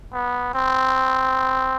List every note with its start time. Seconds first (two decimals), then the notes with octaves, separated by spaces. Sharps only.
0.13 B3
0.54 C4